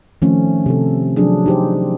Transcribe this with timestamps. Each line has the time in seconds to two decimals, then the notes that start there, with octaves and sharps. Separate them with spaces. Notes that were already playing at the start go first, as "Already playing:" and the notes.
0.22 D#3 F3 A3 C4 C#4
0.66 C3 C4 A4
1.16 F3 F#3 D4 G#4
1.46 D#4 G4 C5